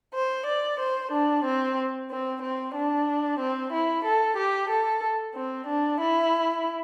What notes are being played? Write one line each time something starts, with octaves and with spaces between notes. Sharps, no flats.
C5
D5
C5
D4
C4
C4
C4
D4
C4
E4
A4
G4
A4
C4
D4
E4